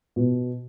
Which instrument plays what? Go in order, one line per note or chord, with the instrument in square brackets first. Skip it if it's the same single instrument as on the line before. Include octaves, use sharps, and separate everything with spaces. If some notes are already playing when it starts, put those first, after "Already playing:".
[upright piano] B2